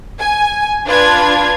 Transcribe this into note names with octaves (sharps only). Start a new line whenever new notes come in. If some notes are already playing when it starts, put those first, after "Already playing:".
G#5
D4 F4 B4 G#6